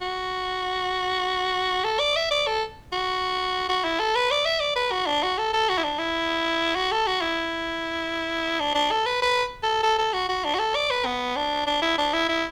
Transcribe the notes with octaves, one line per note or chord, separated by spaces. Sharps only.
F#4
A4
D5
E5
D5
A4
F#4
F#4
E4
A4
B4
D5
E5
D5
B4
F#4
D4
F#4
A4
A4
F#4
E4
D4
E4
F#4
A4
F#4
E4
D4
D4
A4
B4
B4
A4
A4
A4
F#4
F#4
D4
F#4
A4
D5
B4
B3
D4
D4
E4
D4
E4
E4